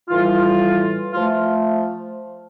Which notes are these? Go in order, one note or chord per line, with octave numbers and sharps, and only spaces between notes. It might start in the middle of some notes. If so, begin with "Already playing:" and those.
A2 E3 G3 F4
F3 A3 F4